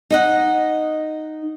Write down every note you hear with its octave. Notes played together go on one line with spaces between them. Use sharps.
D#4 D#5 F#5